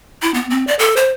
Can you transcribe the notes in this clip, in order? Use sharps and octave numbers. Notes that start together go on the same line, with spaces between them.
E4
B3
C4
D5
A4
C5